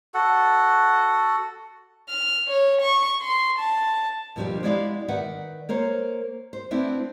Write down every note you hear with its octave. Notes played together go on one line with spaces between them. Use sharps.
F#4 A4 F#5
F6
C#5
C#6
C6
A5
D#2 B2 F3 G3 D4 G4
G#3 B3 E4 G4 D5 F5
D#3 B4 D5 E5 F#5
A#3 A#4 C5 C#5
C5
A3 B3 C4 D4 E4